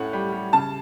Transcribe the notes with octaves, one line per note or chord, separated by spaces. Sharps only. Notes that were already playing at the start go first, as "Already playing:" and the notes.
Already playing: A2 C#4 F#5
G3
G3
C#3 A5